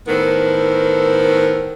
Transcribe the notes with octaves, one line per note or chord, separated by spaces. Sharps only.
A2 D#3 B3 A4 A#4 C5